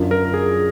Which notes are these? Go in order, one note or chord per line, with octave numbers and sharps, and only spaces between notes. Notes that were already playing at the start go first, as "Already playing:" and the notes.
Already playing: F#2 D3 F#3 D4 F4
A#4
G#4